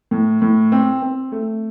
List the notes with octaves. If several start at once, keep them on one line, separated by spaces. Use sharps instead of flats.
A2
A2
C4
C4
A3